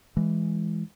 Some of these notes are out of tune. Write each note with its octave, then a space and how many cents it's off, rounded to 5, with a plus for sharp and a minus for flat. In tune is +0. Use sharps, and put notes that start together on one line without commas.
E3 +5 G#3 +0